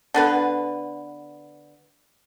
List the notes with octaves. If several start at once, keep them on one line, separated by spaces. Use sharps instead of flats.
D3 B3 B4